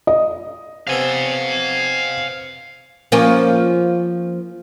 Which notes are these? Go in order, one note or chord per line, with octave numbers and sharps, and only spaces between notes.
D#5
C3 B3 A4 F5 G#5
F3 A#3 C#4